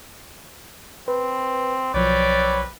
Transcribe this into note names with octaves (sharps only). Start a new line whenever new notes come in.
C4 B4
B1 F3 F#3 C4 B4 C#5 D5